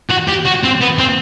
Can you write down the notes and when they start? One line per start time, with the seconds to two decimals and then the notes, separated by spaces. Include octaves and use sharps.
0.10 F#4
0.28 G4
0.45 F#4
0.63 C4
0.81 B3
0.98 C4